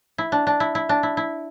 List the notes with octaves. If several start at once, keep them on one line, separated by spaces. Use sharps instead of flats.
E4
D4
D4
E4
E4
D4
E4
E4